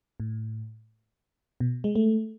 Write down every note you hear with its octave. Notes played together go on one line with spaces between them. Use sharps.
A2
B2
G#3
A3